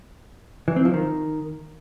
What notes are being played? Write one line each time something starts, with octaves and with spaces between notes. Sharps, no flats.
E3
C4
F3
D#3